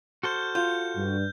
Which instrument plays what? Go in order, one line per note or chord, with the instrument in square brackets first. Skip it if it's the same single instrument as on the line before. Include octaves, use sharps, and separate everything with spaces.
[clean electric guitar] F#4 A4 C5 [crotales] F6 G6
[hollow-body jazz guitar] F4 [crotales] G6
[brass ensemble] G2